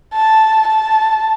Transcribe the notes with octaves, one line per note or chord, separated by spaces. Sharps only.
A5
A5